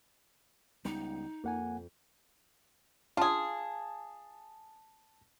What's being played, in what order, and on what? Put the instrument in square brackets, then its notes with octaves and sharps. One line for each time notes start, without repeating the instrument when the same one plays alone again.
[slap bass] C#2 G3 B3 [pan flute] D#4
[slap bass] F2 [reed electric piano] A#3 F#5 G#5
[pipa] F4 G#4 [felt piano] A5